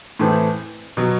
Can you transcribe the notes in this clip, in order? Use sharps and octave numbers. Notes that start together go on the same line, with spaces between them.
A2 E3 A3 C4
B2 F#3